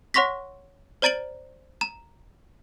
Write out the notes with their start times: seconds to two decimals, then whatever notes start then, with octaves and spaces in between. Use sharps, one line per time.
0.14 C#5 F#5 C6 C#6 A#6 B6
1.02 C5 D5 A#5 A6 D7 F#7
1.81 A#5 E7